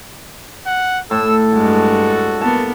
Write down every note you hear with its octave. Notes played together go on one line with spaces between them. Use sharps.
F#5
A2 A4 E6
G2 G#3 F#4
A#3 B3 A5